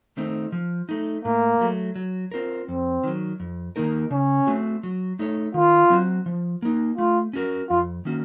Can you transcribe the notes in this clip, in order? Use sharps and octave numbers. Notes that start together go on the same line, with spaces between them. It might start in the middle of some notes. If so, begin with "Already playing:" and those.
D#3 A3 C4 D#4
F3
A3 D#4
A2 A#3
F#3 A3
F#3
C4 F4 A#4
F2 C4
D#3 F#3
F2
D#3 A#3 D#4 A#4
C#3 C#4
A3 C4 F#4
F#3
A3 D#4 A4 C#5
D#3 F4
F#3 C4 F#4
F3
A#3 D#4
A3 F4
C#4 F#4 A#4
F2 F4
D#3 A#3 C#4 F#4